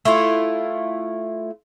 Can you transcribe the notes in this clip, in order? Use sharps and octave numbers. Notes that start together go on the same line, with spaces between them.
A3 E4 F4